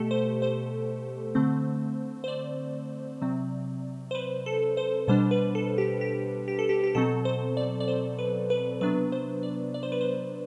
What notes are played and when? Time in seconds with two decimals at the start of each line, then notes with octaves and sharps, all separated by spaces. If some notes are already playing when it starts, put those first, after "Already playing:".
Already playing: B2 A3 G4 A4
0.11 C5
0.42 C5
1.35 D3 A3 C4
2.24 C5
2.28 D5
3.22 C3 F#3 C4
4.11 C5
4.15 B4
4.46 A4
4.77 C5
5.08 B2 G3 D4 C5
5.31 B4
5.55 A4
5.78 G4
6.01 G4
6.48 G4
6.59 A4
6.69 G4
6.84 G4
6.95 B2 F#3 C4 A4
7.25 C5
7.57 D5
7.80 D5
7.88 C5
8.19 B4
8.50 B4
8.81 C3 F#3 B3 D4 B4
9.12 C5
9.43 D5
9.74 D5
9.83 C5
9.92 B4
10.01 C5